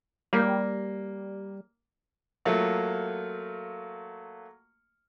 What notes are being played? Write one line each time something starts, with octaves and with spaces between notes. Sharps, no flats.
G3 A#3
F#3 A3 A#3 F4